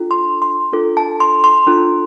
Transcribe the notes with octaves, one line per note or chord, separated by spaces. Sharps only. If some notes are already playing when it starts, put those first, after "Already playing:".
Already playing: D4 F4 A4
C6
C6
D4 F4 A4
A5
C6
C6
D4 F4 A4